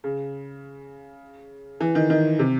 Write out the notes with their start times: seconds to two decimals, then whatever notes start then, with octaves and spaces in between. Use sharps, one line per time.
0.04 C#3
1.80 E3
1.95 D#3
2.10 D#3
2.39 C3